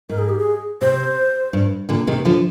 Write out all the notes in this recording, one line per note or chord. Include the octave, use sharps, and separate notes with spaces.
G#2 A#4
G#4
G4
G#4
C3 C5
G2
A#2 D3
C3 D#3
D3 F3